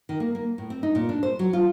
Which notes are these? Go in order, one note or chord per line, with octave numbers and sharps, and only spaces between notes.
D#3
A#3
A#3
A2
C4
D#4
A#2
D4
C5
F#3
F4